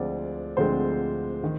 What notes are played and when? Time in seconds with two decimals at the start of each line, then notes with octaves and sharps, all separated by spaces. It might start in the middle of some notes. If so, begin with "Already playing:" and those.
Already playing: D2 D3 F3 G#3 C4 D5
0.57 D2 D3 F3 G#3 C4 C5
1.44 D#3